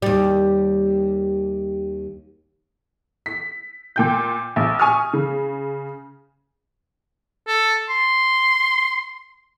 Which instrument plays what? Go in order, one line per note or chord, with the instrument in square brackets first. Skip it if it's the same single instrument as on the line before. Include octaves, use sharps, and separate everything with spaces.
[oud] D#2 G3
[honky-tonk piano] B6
A#2 G5 G6
A#1
G#5 C#6 D#6 F6
C#3
[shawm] A4
C6